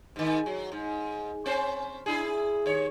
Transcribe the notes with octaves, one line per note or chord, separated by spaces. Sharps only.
G#2 D#3
F#3
G#2
C4 C#4 C5
D4 E4 G#4
D#2 C#5